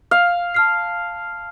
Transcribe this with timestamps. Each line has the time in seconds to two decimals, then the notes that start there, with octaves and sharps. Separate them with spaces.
0.11 F5
0.54 A5 F6 C7